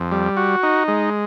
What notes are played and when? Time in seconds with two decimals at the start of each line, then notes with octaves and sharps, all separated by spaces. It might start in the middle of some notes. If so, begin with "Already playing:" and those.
Already playing: F2
0.11 G3
0.37 F#4
0.63 D#4
0.88 G#3